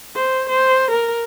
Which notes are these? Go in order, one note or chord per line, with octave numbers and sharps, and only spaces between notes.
C5
C5
A#4